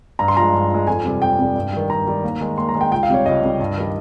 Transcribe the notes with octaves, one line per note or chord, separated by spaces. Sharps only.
G2 A#5
C6
F3 G#3 A#5
G2
F3 G#3
F2 G#5
C3 G3
F2 G5
C3 G3
G2
D#3 G3
G2 A#5
D#3 G3
D#2
D#3 G#3
D#2 C6
A#5
D#3 G#3
G5
C#2 G5
F5
C3 G3 C#5
C#2 D#5
C3 G3
G2
D#3 G3